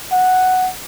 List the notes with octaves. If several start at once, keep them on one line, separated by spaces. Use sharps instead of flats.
F#5